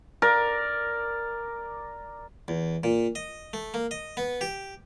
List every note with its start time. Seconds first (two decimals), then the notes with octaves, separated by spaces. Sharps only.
0.22 A#4 D5
2.48 E2
2.84 A#2
3.15 D#5
3.53 A3
3.74 A#3
3.91 D#5
4.17 B3
4.41 G4